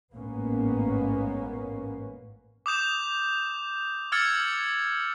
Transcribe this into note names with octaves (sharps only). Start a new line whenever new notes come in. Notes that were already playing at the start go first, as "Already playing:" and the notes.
A1 G#2 A#3 B3 C#4
D6 D#6 G6 E7
D6 E6 F6 G#6 A6 C#7